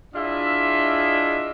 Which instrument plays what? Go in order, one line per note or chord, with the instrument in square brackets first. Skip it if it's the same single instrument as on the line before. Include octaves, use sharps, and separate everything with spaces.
[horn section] D4 E4 F4 G#4 D#5 E5